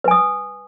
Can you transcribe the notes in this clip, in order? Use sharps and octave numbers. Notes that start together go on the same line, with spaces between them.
B4 G#5 D#6